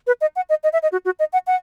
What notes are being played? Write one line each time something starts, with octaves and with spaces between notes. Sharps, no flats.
B4
D#5
F#5
D#5
D#5
E5
D#5
F#4
F#4
D#5
F#5
F#5